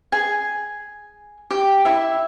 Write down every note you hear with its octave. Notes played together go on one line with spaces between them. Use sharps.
G#4 G#5
G4 G5
E4 E5